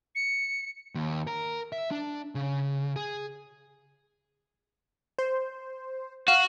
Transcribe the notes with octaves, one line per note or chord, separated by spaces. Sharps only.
C#7
D#2
A#4
E5
D4
C#3
G#4
C5
F#4 F5